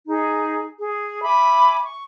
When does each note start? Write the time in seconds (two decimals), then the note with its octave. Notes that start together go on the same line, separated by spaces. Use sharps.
0.07 D#4 G#4
0.79 G#4
1.23 E5 G#5 B5 D6
1.85 C#6